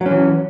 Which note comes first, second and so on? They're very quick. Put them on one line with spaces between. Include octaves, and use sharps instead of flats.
F#3 C#4 E3